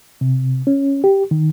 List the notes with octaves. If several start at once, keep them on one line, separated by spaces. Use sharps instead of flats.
C3
C#4
G4
D#3